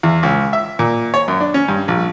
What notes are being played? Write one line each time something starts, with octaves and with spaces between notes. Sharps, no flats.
E2
C#2
E5
A#2
C#5
F#2
D4
C#4
G2
A#1